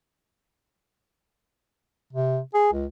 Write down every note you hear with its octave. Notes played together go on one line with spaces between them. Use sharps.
C3
G#4
C#2